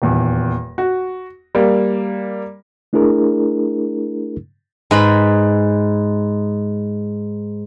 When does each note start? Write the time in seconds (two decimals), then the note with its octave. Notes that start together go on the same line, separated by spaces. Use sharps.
0.02 D#1 E2
0.78 F#4
1.55 G3 A#3
2.93 A3 D4 E4 G#4 A#4
4.91 G#2 B4 B5